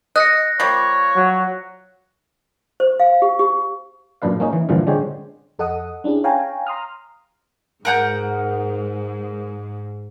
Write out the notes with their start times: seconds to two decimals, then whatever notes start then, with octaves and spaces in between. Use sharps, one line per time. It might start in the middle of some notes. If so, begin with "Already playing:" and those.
0.16 D#5 F#6 A#6 C#7
0.60 F3 G3 A#3 C#5
1.16 F#3
2.80 C5
3.00 F5
3.22 G4
3.39 G4
4.22 F#2 A#2 D4 B4 F5
4.40 A#3 C#4 D#4
4.53 E3
4.69 G2 A#2 D3 E3 F3
4.87 D3 G#3 D4 G4 C5 C#5
5.59 F2 A4 D#5 F#5 D#6
6.04 C#4 D4 E4 G4 G#4
6.24 C#5 F5 G5 G#5 A#5
6.67 A#5 C6 D#6 F6
7.85 G#2 A#4 F#5 G6